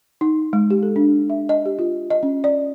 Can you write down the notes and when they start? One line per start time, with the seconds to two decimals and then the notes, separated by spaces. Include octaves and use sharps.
0.21 D#4
0.53 G#3
0.70 G4
0.83 A4
0.96 D4
1.30 E5
1.49 D#5
1.66 G4
1.79 F4
2.10 D#5
2.23 C#4
2.44 D5